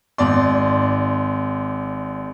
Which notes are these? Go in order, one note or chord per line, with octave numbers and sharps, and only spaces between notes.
G#1 D5 C6